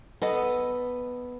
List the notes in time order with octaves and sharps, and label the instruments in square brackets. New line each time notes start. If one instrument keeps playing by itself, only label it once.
[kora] B3 A4 D#5